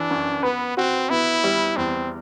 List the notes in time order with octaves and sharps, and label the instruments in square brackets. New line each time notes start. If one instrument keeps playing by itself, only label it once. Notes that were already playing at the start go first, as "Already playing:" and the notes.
Already playing: [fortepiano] E3 [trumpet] D4
[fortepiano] F#2
[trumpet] B3 [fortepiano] B4
[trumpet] C4 [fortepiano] F#4
[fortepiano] B3 [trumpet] E4
[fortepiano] G3
[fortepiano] E2 [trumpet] C4